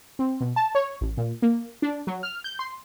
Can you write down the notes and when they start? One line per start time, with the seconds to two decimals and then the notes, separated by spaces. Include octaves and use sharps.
0.19 C4
0.41 B2
0.56 A5
0.75 C#5
1.01 A1
1.17 A#2
1.42 A#3
1.82 D4
2.07 F#3
2.23 F6
2.44 G6
2.59 C6